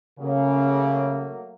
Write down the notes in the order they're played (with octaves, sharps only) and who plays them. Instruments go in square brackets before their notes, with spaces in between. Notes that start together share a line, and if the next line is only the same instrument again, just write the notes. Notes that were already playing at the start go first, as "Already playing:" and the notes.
[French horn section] C#3 [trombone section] F#3 A3 A#3